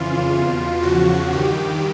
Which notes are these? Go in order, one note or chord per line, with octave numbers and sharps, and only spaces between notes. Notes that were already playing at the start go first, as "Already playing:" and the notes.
Already playing: F2 C#3 E3 F4
E2 B2
E2 C#3 F3 F#4
G2 D#3 G4